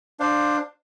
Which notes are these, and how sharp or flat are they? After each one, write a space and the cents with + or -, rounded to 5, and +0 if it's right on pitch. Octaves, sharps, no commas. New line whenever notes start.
D4 +15 C5 +0 F5 +10